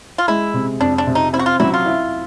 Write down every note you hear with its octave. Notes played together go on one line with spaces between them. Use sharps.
F4
G#3 E4
C3
F2 D4
D4
C3
D#4
C4 E4
F#4
F4
F#3 E4
F4
E4